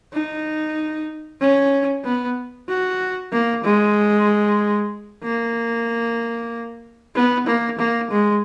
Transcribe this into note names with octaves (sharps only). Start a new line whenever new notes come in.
D#4
C#4
B3
F#4
A#3
G#3
A#3
B3
A#3
A#3
G#3